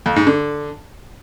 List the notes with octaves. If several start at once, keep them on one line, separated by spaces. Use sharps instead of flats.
F2
G#2
D3